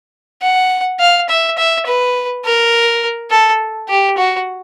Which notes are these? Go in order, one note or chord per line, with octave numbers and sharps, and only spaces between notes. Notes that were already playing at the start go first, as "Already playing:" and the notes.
F#5
F5
E5
E5
B4
A#4
A4
G4
F#4